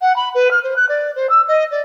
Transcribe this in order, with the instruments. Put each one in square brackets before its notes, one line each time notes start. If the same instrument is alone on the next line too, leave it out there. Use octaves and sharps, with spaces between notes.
[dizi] F#5
B5
B4
F6
C5
F#6
D5
C5
E6
D#5
D5